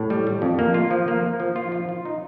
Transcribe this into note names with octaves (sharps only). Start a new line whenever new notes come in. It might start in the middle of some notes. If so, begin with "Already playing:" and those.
Already playing: A2
G3
G3
F2
A#3
F4
F3
A#3
A#3
F3
F4
F4
F4
D#4